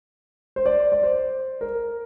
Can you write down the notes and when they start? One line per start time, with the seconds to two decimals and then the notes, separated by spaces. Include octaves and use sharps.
0.56 C5
0.66 D5
0.92 D5
1.03 C5
1.61 A#4